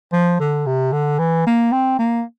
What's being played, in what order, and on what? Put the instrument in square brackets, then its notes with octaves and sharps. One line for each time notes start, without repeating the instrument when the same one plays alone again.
[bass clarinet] F3
D3
C3
D3
E3
A#3
C4
A#3